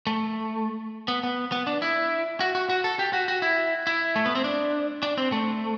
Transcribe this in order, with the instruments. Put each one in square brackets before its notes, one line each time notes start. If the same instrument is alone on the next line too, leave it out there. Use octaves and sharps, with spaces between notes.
[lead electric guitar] A3
B3
B3
B3
D4
E4
F#4
F#4
F#4
A4
G4
F#4
F#4
E4
E4
A3
B3
C4
D4
D4
C4
A3